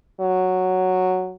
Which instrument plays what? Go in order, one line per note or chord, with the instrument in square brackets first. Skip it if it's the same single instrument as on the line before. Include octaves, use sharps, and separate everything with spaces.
[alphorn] F#3